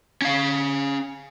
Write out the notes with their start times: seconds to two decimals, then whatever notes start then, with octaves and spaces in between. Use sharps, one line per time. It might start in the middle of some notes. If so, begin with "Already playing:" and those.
0.22 C#4 F5